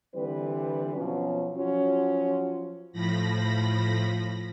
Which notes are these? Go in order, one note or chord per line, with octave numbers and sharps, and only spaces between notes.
D3 E3 G3 C4 B4
B2 F3 F#3 C#4
F3 F#3 C#4 F4 F#4
A2 F3 B5 A#6